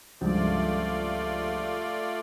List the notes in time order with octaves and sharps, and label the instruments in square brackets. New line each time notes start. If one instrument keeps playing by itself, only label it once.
[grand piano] C#2 G2 F3 [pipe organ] A3 F4 D5